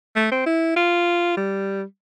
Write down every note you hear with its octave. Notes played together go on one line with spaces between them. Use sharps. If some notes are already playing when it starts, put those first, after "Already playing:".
A3
C4
E4
F4
G3